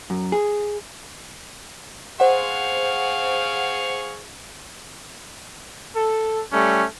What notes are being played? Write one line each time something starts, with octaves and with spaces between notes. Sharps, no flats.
F#2
G#4
G#4 C5 F5 F#5 C#6
A4
G3 A3 C#4